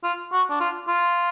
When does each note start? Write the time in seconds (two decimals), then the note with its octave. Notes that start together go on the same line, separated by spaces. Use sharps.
0.04 F4
0.32 F#4
0.50 D4
0.60 F4
0.88 F4